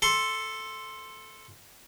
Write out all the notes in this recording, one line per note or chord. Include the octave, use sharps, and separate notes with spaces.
A4 C6